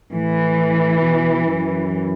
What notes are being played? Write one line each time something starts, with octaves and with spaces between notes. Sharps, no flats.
A2 E3
B2
F#2